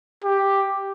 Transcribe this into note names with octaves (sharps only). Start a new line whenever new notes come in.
G4